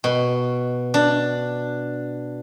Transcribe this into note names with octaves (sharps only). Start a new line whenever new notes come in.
B2
D4